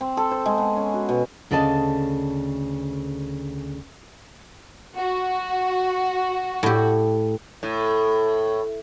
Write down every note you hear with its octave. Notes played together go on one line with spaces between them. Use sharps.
C4
A4
C5
G#3
B3
C#4
F#4
B2
D2 C#3 D5 D#5 G#5 A5
F#4
A2 G4
A2